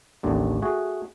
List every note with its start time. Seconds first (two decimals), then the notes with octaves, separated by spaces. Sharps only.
0.23 A1 D#2 D3
0.62 A3 F#4 G#4